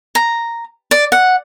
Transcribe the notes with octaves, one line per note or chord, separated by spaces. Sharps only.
A#5
D5
F#5